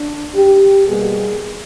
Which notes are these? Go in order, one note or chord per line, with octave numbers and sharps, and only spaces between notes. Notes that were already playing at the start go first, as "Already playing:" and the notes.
Already playing: D4
G4
B2 G3 A#3 G#4